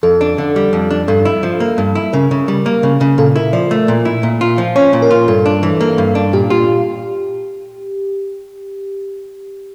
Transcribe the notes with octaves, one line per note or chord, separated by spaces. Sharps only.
F2 A4
D4
D3
G3
F2
D4
G2 A4
E4
F3
A#3
G2
E4
C#3 A#4
C#3
G3
A#3
C#3
C#3
A#2 A4
E4 A#4
F3 D5
A3
A#2
E4
A#2
F4
F3
C#4 C#5
A#2
A#4
F4
G2 A4
D4
E3
A#3
G2
D4
A#2 G4
F4 G4